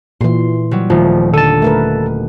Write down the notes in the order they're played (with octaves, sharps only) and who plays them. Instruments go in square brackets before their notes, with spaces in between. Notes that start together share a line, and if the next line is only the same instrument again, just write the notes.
[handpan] A#2 E3 [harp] C6
[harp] F#3 G3
[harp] D#1 [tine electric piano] F3 [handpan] A3
[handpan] D3 [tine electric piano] A4 A5 [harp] D#7
[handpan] A3 A#4 B4